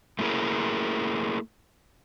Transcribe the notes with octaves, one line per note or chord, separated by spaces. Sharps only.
A3 A#3 E4 G#4 A#4